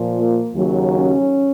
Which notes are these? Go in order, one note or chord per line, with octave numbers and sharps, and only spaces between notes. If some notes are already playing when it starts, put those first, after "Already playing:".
Already playing: A#2 F3
A#3
D#2 C#3 F#3
C#4